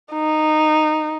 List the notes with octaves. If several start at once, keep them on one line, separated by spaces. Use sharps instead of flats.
D#4